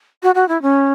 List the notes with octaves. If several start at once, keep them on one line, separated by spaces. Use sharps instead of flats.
F#4
F#4
E4
C#4